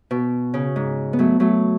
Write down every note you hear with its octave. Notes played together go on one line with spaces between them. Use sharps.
B2
C#3
G#2
B3
F#3 A3
F#3 A3